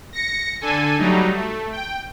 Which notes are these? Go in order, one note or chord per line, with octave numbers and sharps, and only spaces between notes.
A#6 C#7
D3 A4 G#5
F#3 G3 A3 D#4
A3
G5